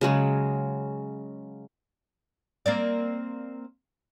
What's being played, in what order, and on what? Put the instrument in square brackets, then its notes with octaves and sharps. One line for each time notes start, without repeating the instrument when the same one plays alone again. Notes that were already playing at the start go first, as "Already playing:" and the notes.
[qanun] C#3 F#3 G#3
[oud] A#3 C4 D5